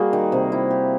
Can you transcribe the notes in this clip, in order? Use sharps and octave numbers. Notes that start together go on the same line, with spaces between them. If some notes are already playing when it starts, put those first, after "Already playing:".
Already playing: G3 A#3 F#4 G#4
D#3
C3
E4
G4